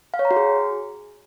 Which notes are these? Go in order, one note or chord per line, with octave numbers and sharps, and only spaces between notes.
F5
C#5
A#5
F#4
G#4